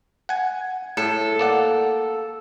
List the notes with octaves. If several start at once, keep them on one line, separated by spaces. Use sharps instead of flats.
F#5 G#5
A2 A4
A#3 D5 F#5